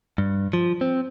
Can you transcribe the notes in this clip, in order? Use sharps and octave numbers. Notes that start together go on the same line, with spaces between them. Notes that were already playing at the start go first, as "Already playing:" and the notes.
G2
F3
C4